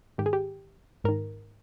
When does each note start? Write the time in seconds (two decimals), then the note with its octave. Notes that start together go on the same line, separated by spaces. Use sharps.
0.18 G#2 D#3 G4
0.26 G#4
0.33 G4
1.04 G#2 D#3 A#4